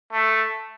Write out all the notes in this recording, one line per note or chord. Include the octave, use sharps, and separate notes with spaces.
A3